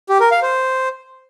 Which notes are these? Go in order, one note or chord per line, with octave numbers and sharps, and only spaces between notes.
G4
A#4
F5
C5